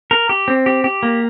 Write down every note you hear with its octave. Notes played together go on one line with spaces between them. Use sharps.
A#4
G4
C4
G4
G4
A#3